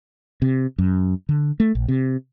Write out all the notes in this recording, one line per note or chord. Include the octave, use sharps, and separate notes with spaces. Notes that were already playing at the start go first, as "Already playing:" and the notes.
C3
F#2
D3
A3
A#1
C3